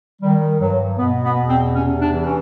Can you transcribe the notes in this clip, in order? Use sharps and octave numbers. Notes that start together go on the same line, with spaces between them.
D#3 G3
G2 F#3
B2 B3
B3
E2
C4
C3 C#4
D4
E3
C#4